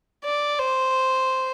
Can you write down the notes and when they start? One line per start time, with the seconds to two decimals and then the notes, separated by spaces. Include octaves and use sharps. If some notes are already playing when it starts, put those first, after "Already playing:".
0.24 D5
0.59 C5